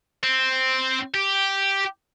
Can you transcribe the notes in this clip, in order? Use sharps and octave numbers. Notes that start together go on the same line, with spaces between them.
C4
G4